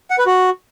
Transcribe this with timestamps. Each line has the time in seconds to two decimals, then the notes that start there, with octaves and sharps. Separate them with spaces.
0.10 F#5
0.18 B4
0.26 F#4